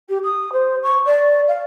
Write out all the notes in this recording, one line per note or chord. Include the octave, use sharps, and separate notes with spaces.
G4
D#6
C5
C#6
D5
F5